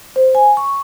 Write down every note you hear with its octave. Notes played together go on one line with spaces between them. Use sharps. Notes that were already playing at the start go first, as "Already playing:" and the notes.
C5
G#5
C#6